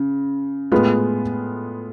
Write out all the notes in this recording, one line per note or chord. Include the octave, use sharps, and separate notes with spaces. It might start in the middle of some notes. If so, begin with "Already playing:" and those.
Already playing: C#3
A2 G#3 B3 F4